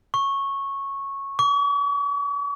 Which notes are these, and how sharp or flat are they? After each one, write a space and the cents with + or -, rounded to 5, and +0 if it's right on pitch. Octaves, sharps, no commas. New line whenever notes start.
C#6 -10
C#6 +45